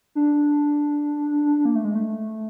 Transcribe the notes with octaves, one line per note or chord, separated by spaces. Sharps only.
D4
A#3
A3
G#3
A3